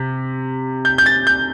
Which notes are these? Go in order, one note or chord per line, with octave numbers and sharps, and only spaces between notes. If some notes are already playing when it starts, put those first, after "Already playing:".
Already playing: C3
G6
G6
A6
G6